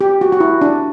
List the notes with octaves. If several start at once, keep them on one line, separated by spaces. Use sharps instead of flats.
G4
F#4
F#4
E4
D4